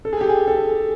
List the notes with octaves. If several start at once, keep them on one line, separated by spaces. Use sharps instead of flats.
A4
G#4
G4
G#4
A4